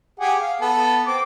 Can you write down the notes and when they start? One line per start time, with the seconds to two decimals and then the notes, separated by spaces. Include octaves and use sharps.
0.20 G4 G#4 F#5
0.40 F5
0.61 B3 A4
1.07 C4 D6